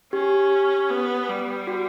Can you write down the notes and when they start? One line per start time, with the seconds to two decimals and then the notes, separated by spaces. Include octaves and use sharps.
0.13 C#4 G4
0.90 B3
1.29 G3
1.67 F#4